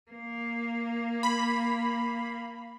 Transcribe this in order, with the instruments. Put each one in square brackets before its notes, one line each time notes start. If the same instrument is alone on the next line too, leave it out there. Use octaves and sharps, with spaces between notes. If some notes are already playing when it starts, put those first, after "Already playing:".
[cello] A#3
[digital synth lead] B5